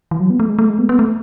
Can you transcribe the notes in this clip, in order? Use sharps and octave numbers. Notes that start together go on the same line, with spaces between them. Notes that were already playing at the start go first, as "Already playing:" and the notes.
E3
F#3
B3
A3
G#3
A3
G#3
B3
B3
A3